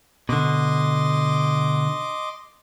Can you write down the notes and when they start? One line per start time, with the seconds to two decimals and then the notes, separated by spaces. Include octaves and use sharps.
0.29 B2 D3 D#5 C6 D6